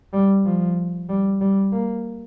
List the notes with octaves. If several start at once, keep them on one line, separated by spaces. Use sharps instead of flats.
G3
F3
G3
G3
A#3